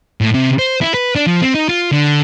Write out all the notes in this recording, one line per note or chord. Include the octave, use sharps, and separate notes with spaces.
A2
C3
C5
E4
B4
D4
F3
C4
D#4
F4
D3